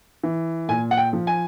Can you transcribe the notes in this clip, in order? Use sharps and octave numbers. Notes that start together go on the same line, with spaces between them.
E3
A#2 G#5
F#5
G5
F3
G#5